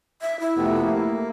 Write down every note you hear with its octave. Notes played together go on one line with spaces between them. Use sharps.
E5
E4
F2 C3 A3 B3
A#3